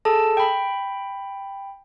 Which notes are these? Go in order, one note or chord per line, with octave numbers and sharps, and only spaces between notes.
G#4 A4 A5
G5 B5